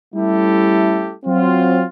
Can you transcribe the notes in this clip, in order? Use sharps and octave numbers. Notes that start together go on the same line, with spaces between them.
G3 A3 C#4 E4 G4 A4
F#3 C4 F4